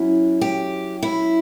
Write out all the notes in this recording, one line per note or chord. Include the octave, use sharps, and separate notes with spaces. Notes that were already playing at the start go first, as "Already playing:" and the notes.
Already playing: F#3 C#4 E4
G4
E4